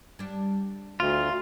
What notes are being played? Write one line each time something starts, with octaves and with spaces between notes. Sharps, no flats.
G3 D4
D2 F4